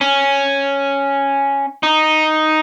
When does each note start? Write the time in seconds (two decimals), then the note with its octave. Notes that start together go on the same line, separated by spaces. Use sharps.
0.01 C#4
1.83 D#4